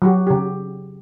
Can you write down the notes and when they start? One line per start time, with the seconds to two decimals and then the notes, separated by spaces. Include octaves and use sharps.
0.02 F#3 F#4 G4
0.27 C#3 G4